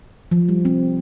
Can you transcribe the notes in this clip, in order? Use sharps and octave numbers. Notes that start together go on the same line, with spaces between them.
F3
G3
C4